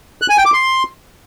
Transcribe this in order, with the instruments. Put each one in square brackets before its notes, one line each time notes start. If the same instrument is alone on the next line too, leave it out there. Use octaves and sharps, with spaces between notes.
[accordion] F#6
G#5
G5
D6
C6